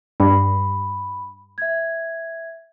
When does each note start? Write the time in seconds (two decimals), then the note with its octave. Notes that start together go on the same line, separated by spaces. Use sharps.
0.20 G2 B5
1.58 E5 G#6